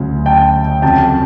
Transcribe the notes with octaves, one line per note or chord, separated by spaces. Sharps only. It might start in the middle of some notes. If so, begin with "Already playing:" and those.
Already playing: D2 C#3 F#3
G5 A5
F2 C#3 F#3 G5 A5